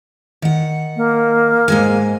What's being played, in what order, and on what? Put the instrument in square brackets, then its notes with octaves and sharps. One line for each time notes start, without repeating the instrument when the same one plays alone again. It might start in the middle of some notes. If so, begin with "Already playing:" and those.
[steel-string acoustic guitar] D#3 F#5
[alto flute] A#3
[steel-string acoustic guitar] G#2 G#3 G#5